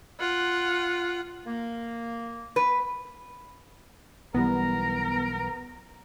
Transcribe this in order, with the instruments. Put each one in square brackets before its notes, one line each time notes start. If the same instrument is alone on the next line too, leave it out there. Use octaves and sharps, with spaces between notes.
[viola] F4 F#5
[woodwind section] A#3
[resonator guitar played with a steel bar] B4
[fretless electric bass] B1 E3 G3 [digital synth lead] B3 [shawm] A#4 [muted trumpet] A#5